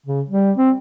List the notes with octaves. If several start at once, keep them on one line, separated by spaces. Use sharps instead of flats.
C#3
G3
C4